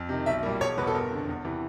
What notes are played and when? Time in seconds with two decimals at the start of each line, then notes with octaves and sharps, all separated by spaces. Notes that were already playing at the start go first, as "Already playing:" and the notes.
Already playing: F2
0.09 C3 D#3
0.26 B1 E5
0.43 A#2 G3 A#3
0.60 E1 C#5
0.77 E2 B2 B4
0.87 A4
0.94 G1 A#4
1.11 F2 D3
1.28 E2
1.45 C3 E3